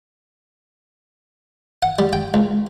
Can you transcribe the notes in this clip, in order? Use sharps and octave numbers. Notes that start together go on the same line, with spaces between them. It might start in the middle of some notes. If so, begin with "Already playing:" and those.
F#5
G3
G5
C#2